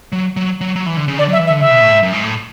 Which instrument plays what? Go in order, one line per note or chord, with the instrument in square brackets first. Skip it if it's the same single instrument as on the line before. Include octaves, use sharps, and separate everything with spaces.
[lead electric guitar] F#3
F#3
F#3
F#3
E3
D3
C#3
[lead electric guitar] D3 [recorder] D5
[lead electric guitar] F#3 [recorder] E5
[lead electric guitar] E3
[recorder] E5
[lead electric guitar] D3
[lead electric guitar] C#3 [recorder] E5
[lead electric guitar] B2
A2
G#2
F#2
G#2
A2